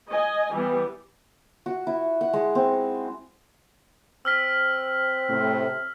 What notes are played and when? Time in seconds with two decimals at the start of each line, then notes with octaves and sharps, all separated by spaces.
0.11 D#5 G#5
0.54 E3 G3 B3
1.66 F#4
1.87 E4
2.21 F#5
2.33 G#3
2.55 C4
4.25 C4 E6 F6 B6
5.29 A2 C3